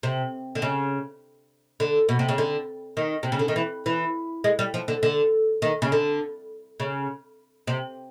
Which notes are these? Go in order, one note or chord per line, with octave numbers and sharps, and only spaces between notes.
C3
D3
C#3
D3
B2
C3
C#3
D3
D#3
C3
C#3
D3
D#3
E3
E3
G#3
G3
F3
D3
D3
D#3
C#3
D3
C#3
C3